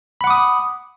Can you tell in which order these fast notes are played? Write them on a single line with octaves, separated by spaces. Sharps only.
B5 F#5 D6 D#6